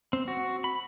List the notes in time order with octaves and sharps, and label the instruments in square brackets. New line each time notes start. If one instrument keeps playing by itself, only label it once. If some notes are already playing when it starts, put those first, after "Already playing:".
[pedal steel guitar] C4
F#4
B5